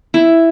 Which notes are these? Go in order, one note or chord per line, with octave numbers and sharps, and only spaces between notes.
E4